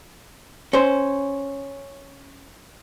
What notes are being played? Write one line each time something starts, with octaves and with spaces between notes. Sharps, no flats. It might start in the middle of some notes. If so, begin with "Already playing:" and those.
C#4 C5